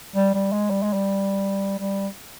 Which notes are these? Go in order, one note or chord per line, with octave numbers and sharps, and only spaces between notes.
G3
G3
G#3
G3
G#3
G3
G3